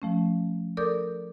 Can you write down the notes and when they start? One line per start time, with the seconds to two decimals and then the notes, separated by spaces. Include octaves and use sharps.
0.02 F3 A3 C#4
0.77 A4 A#4 D5 D6 D#6 G6